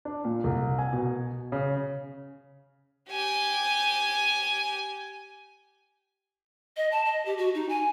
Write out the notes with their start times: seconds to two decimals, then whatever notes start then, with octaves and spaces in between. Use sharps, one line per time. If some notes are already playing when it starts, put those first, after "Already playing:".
0.05 D4
0.25 A#2
0.44 C2
0.79 G#5
0.93 B2
1.52 C#3
3.10 G4 G#5
6.77 D#5
6.92 A5
7.05 D#5
7.26 G4
7.38 F#4
7.55 D#4
7.69 G#5